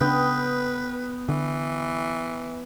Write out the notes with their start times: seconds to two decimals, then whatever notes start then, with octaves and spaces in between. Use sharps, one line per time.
0.01 C#3 B3 D4 B4 G5
1.29 D3 E3